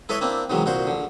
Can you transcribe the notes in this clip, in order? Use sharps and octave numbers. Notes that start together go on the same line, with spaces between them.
E4 A4 B4 C#5 D#5 E5
A#3 C4 D4 E4
C3 D#3 E3 F#3 G#3
C2 A#2 F#4 C5
A#1 D3